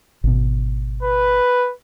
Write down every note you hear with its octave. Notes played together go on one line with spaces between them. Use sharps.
G#1 B2
B4